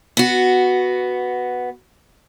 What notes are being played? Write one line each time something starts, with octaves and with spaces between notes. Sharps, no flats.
B3 F#4